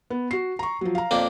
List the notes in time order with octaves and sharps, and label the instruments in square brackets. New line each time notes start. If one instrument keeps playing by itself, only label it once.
[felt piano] B3
F#4 C7
A#5 C#6
F3 F#3
F5 A#5
[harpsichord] F2 A#3 D4